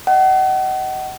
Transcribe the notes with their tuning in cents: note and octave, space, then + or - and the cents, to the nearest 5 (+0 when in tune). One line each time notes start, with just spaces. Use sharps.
D#5 +0 F#5 +40